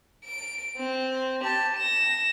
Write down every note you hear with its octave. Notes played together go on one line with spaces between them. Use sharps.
D7
C4
G4 A5
A#6 E7